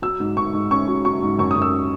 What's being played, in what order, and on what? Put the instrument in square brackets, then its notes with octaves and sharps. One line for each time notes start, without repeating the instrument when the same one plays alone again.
[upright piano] F#3 E6
G#2
G#2 C#6
G#2
C#4 C#6
F#3
F#3 C#6
G#2
F#2 C#6
D#6
F#2
E6